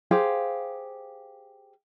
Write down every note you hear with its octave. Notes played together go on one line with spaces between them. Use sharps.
G4 G#4 C5 F5